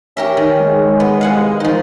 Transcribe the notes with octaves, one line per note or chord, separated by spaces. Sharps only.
C#4 G4 A#4 E5
D#3
G#3
B3
C2 F5 F#5 G#5
D#3 F3 D#4